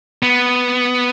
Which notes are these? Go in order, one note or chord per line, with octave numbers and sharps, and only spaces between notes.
B3